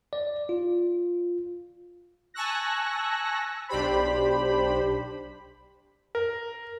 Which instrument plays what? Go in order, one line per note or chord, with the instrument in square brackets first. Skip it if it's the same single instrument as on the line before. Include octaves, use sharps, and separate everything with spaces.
[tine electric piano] D5
F4
[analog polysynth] G#5 A5 C#6 E6 F#6 A#6
B1 D4 G4 C5 B5
[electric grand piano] A#4